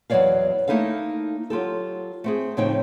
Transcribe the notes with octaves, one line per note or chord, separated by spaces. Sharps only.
E2 F#3 A#3 C#5 D5 F5
A3 A#3 D#4 E4 A4 F5
F#3 F4 G4 A4
A3 C4 G#4
A2 C#3 F3 C4 D#4 G5